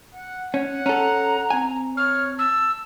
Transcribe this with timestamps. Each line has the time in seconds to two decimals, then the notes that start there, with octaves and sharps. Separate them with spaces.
0.15 F#5
0.54 C#4 F#5
0.86 C#4 A4 A#5
1.50 C4 G#5
1.97 C#5 F6
2.39 A5 E6